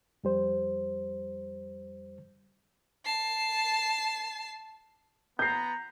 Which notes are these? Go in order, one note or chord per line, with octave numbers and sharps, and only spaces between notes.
F2 G3 C5
A5 C7
B3 A#5 G6 C7